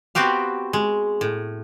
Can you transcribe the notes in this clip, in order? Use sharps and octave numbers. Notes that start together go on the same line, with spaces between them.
B3 C4 F#4 G4 F5
G#3
A2